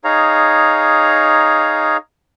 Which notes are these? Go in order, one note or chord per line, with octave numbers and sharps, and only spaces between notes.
D#4 G#4 C#5 F5 A#5